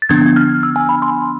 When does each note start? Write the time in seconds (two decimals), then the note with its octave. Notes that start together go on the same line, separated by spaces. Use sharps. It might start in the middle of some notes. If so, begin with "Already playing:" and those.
0.02 A6
0.09 D3 F3 B3 D4 G#6
0.36 F6
0.63 E6
0.76 G#5
0.89 B5
1.02 C6